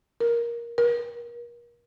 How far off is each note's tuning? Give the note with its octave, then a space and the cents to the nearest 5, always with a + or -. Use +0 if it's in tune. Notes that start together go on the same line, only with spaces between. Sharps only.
A#4 +10
A#4 +35